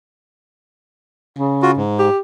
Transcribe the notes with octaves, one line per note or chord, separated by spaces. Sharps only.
C#3
F4 F#4
G#2
G4